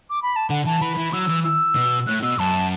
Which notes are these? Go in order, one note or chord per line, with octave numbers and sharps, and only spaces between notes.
D6
B5
A5
D3 F#5
E3 A5
E3 B5
E3
F#3 E6
E3
E6
B2
A2 F#6
B2 E6
F#2 A5